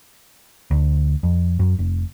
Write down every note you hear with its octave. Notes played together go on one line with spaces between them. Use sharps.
D2
F2
F#2
F1